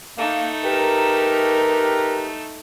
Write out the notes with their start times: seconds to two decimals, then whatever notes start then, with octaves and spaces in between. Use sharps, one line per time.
0.18 A3 A#3 D#4
0.64 G4 A#4 B4